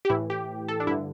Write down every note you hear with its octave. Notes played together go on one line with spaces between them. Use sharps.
G4
A2 E3 E4
G4
A4
D4
G2 D3 E4